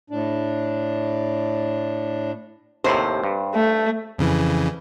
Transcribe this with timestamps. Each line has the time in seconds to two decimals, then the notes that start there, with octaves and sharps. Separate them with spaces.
0.10 A2 D4
2.84 D#2 A2 C3 C5
3.24 G2
3.54 A3
4.19 F2 C#3 E3